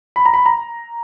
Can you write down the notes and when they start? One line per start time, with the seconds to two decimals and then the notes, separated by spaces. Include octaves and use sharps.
0.16 B5
0.26 A#5
0.34 B5
0.46 A#5